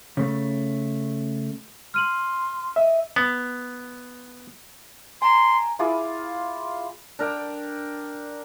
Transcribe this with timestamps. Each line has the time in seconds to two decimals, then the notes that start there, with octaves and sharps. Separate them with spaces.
0.17 C#3 A3
1.94 C6 F6 D#7 F#7
2.76 D#5 E5
3.16 B3
5.22 G#5 A#5 C6
5.79 E4 F4 G#4 D6
7.19 D4 A#4 G5